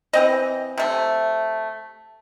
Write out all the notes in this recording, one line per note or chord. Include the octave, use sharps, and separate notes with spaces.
E3 C4 D#5
C3 A3